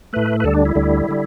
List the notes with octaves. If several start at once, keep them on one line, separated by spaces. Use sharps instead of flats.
A2 A3 B4
B4
D2 D3 G3 A4
D4
E4
D2 D3 G3
D3 G3